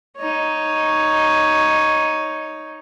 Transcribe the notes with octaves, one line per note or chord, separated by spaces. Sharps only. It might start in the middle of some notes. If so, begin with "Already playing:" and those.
D#4 C#5